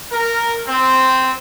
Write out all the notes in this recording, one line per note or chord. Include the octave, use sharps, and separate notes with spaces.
A#4
C4